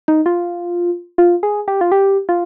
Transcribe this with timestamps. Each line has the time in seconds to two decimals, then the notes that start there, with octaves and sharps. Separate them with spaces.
0.08 D#4
0.26 F4
1.18 F4
1.43 G#4
1.68 G4
1.81 F4
1.92 G4
2.29 F4